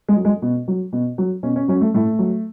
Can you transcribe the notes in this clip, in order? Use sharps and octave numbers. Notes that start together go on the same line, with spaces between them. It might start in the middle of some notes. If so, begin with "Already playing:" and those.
G#3
F#3
G#3
B2
F#3
B2
F#3
B2 C#4
C#4
F#3 C#4
A3
A2 A3
F#3